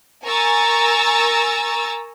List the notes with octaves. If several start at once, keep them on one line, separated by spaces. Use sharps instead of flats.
A#4 G#5 A#5 C#6 E6 A6